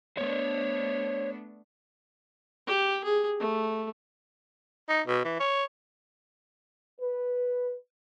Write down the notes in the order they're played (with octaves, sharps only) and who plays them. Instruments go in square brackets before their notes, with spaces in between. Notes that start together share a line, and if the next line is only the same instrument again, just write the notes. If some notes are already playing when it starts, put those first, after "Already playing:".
[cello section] A3 B3 D4 [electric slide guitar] C5 C#5
[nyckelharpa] G4
G#4
A3
[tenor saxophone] D#4
B2
E3
C#5
[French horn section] B4